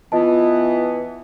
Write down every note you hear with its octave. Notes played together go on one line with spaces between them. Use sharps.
E3 B3 F4 D#5 A5